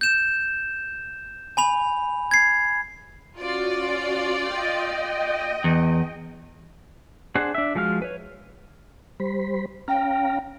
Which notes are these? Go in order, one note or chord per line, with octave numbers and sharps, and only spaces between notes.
G6 E7
G#5 B5 F7
G#6 C7
C#4 F4 F#4 D5
D#5 G5
E2
D4 G#4 C5 F#5
D4 E5
F3 G#3 F#4 F5 F6
B4 C#5
G3 C5 B5
C#4 F5 G5 A#5